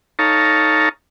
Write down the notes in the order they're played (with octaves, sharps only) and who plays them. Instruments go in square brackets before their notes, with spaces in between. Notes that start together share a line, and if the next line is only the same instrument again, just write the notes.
[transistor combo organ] D#4 A4 C#5 F5 A5 A#5